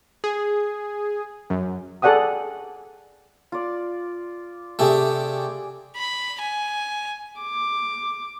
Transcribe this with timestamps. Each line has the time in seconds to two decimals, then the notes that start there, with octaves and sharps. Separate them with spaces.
0.24 G#4
1.50 F#2
2.02 G#4 A4 D5 F#5 G5 D#6
3.52 F4 D5
4.79 C3 A3 G4 G#4 D5
5.96 B5
6.41 G#5
7.40 D6